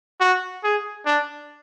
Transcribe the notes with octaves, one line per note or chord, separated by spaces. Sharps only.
F#4
G#4
D4